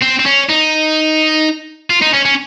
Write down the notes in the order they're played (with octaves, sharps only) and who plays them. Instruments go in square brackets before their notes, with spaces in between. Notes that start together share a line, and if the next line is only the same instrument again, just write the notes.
[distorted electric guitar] C4
C4
C#4
D#4
F4
D#4
C#4
C#4